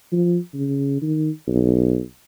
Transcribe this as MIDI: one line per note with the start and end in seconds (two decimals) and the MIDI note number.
0.12 0.37 53
0.54 0.97 49
1.02 1.29 51
1.47 2.00 35